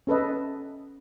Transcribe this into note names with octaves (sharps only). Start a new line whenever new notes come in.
C#4 A4 B4 D#5